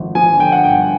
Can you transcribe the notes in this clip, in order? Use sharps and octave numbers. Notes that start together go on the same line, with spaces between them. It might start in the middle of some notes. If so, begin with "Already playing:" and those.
Already playing: G#1 D3 F3
F3 G#5
D3 G5
F#5
G2 G5